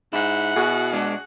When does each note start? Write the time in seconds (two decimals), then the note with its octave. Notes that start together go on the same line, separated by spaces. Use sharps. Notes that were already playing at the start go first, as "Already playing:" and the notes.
0.13 G#2 E4 F#5
0.56 B2 F#4 G#4
0.93 G#3 D4